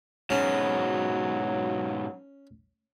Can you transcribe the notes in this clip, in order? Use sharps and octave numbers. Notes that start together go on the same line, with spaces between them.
G#2 B2 F#3 C#4